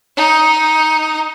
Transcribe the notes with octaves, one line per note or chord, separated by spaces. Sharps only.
D#4